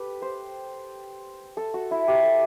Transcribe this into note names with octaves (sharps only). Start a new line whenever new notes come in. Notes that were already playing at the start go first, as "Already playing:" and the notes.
Already playing: G4 A4 B4
C5
A4
F#4
E4
G4
A4